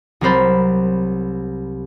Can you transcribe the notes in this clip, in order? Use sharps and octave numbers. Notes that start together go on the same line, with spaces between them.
C2 F#3 A#4 C5 B5 A6